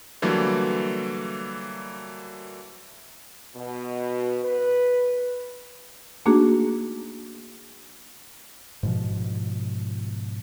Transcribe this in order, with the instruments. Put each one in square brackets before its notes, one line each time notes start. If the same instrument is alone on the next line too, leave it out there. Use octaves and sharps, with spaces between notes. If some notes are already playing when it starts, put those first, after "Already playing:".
[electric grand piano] D3 E3 F#3 G3 A3 A#3
[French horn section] B2
B4
[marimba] A3 A#3 D4 D#4 F#4 G#4
[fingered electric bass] G#2 B2 F3